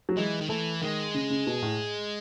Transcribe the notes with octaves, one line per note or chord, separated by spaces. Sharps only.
F#3
E3 G#3
D#3
E3 A3
D#3 G#3
C#3
C#3
B2
A2